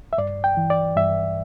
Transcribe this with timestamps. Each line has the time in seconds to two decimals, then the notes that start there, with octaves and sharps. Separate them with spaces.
0.13 E5
0.18 G2 D5
0.44 G5
0.57 E3
0.70 D5
0.97 G2 E5